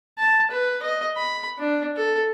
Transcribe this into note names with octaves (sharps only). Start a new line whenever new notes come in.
A5
B4
D#5
B5
D4
A4